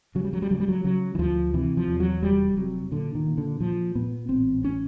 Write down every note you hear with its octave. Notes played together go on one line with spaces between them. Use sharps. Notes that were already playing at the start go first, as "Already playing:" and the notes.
C#3 F#3
G3
F#3
G3
C#3 F#3
G3
F#3
C#3 F#3
E3
D2 F3
C3 E3
F3
E2
F#3
F1 G3
C3 F#3
A#2 D3
D#3
A#2
D3
A#2 F3
A#2 B3
A1 C4
C#4